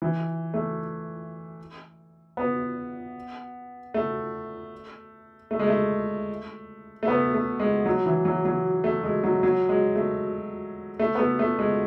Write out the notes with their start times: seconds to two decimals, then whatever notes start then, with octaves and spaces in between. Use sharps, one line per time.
0.02 E3
0.54 A3
2.37 B3
3.94 A3
5.51 A3
5.59 G#3
5.68 A3
7.03 A3
7.08 B3
7.34 A3
7.59 G#3
7.86 F#3
8.06 E3
8.25 F#3
8.45 F#3
8.84 A3
9.03 G#3
9.24 F#3
9.43 F#3
9.69 G#3
9.96 A3
11.00 A3
11.15 B3
11.19 A3
11.39 A3
11.59 G#3